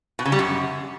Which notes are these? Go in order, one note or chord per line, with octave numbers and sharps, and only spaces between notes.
B2
C#3
G3
F#2